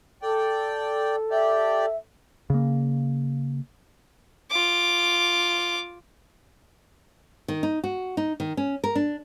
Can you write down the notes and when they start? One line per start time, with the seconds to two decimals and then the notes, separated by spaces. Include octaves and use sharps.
0.22 A4 D5 G5
1.31 G4 D5 E5
2.50 C#3 A#3
4.51 F4 D6
7.48 D#3
7.63 D#4
7.84 F#4
8.17 D#4
8.40 D#3
8.57 C#4
8.84 A#4
8.95 D4